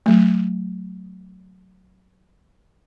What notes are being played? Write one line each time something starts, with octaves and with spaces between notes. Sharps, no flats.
F#3 A3